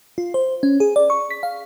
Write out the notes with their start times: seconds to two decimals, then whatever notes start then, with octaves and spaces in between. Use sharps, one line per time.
0.18 F4
0.34 C5
0.63 C#4
0.80 G#4
0.96 D5
1.10 C#6
1.30 B6
1.43 F5